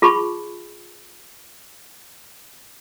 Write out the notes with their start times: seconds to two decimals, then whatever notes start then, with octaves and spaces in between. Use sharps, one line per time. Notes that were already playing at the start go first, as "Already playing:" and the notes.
0.02 F4 G#4 A5 B5 C#6